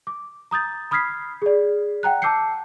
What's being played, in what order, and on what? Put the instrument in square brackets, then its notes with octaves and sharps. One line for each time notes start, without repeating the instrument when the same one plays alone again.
[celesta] D6
A#5 D#6 G6 A6
B5 D#6 F6 G#6 B6 C7
G#4 D5
F#5 G5 A#5 F#6
A5 D6 E6 G6 C7 C#7